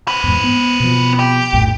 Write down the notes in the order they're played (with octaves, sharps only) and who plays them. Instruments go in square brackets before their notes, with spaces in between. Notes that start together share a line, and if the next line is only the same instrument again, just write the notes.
[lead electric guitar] C4 B4
[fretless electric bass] E2 G#2
B3
B2 F3
[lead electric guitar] G4
[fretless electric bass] A#1 F2 A2